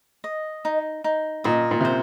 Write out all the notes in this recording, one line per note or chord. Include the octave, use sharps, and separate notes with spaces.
D#5
D#4
D#4
A#2 D#5
A#2
C3
C5